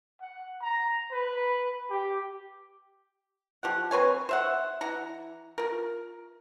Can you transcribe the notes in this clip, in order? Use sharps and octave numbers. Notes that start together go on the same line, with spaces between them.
F#5
A#5
B4
G4
F3 G4 F#5
C4 B4 C#5 G#5
C5 E5 F#5
E3 F#5 A#5
F4 A#4